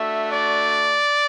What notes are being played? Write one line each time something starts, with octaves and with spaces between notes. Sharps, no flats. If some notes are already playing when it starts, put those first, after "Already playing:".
Already playing: A3 D4 F#4 E5
D5